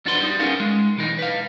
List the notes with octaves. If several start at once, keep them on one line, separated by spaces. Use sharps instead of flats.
F2 D4 F4 F#4 B4 C6
G3 D#4
B3 C#4 D#4 G#4 A#4 F5
G#3
B1 E3 D#4
B4 F5